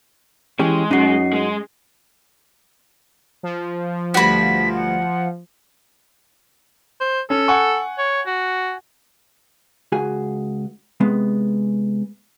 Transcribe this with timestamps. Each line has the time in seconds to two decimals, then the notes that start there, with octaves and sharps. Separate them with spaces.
0.60 E3 G#3 C#4 G4
0.91 F#2 C#4 D#4 F#4 C7
1.33 G#3
3.43 F3
4.14 D2 G2 F#4 B5 B6
4.75 F#5
7.00 C5
7.30 C#4 A4
7.48 F#5 G#5 C#6
7.98 C#5
8.26 F#4
9.92 C#2 F#4 G#4 G#5
11.00 C3 G#3 B3